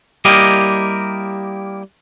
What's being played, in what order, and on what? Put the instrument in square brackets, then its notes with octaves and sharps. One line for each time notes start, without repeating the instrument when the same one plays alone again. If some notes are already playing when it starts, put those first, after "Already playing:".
[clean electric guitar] G3 A#3 E4 G4 A#4 D#5